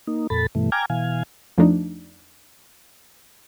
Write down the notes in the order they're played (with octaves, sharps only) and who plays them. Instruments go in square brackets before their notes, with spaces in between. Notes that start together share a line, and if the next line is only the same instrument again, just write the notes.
[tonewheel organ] A#3 D#4
F2 A#2 A4 B5 A6
G2 B2 E3 A3
G5 G#5 A#5 D6 F6 G#6
B2 E3 F5 G#5
[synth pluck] F2 F3 A3 D4 D#4